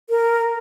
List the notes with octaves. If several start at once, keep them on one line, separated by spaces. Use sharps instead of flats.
A#4